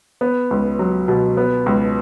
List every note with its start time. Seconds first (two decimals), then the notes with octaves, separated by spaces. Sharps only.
0.21 B3
0.51 C#2
0.79 F#3
1.08 B2
1.37 B3
1.66 C#2